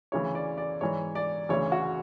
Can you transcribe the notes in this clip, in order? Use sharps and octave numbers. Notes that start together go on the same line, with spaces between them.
D2 C#3 E3 C#5
D5
D5
G#2 E3 C#5
D5
D2 C#3 E3 C#5
F#4